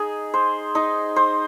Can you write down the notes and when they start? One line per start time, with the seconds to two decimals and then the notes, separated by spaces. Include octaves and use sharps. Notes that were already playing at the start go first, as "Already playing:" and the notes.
Already playing: D#4 G#4
0.34 C5
0.75 D#4
1.16 C5